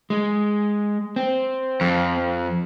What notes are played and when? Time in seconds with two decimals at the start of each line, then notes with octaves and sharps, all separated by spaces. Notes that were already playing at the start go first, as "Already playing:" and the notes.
0.10 G#3
1.16 C4
1.81 F2